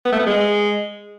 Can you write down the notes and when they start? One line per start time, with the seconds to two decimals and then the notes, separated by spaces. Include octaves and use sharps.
0.05 B3
0.12 A3
0.20 B3
0.27 G#3